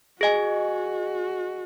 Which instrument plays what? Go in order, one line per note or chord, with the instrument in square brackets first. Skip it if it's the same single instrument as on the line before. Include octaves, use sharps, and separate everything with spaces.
[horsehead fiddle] F#4 [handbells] G#4 D#5 G#5